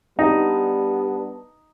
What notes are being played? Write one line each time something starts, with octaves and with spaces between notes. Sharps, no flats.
G3 B3 D4 D#4